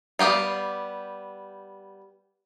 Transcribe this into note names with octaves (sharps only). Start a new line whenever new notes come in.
G3 B3 G4 F5